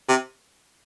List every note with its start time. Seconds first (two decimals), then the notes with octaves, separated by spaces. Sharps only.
0.08 C3